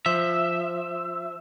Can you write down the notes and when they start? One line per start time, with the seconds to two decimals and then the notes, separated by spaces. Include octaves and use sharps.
0.06 F3 E5